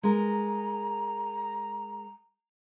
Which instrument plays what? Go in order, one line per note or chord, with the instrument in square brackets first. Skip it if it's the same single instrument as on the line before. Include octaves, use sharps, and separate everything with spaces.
[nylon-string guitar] G#3 A#4 [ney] A#5